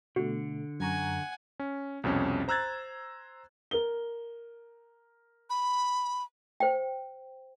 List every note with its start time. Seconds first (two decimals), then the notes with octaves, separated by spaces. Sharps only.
0.16 B2 D3 A3 F#4
0.80 F#2 F#5 G#5 A#5 C#6
1.60 C#4
2.04 C2 F2 B2 C#4
2.48 C5 A#5 E6 F#6 G#6 A6
3.71 A#4 G7
5.50 B5
6.60 C5 G5